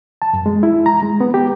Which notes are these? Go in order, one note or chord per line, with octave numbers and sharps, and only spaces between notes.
A5
F#2
G#3
E4
A#5
G#3
B3
G4